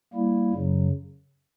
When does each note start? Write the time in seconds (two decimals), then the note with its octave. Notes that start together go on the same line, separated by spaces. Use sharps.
0.14 G3 A#3 E4
0.53 F#2 C#3 F#3